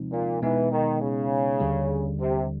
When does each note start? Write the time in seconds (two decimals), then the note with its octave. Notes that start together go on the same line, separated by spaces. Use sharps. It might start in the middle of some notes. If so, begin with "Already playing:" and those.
Already playing: C3 F3 G#3 C4 D#4
0.12 A#2
0.42 B2 E3 G#3 B3 D#4
0.71 D#3
1.01 C#3
1.60 D#2 D3 G3
2.20 C3